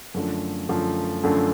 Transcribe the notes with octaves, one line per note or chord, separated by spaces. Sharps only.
F#2 D3 F3 A3
F#2 D3 F3 A3
F#2 D3 F3 A3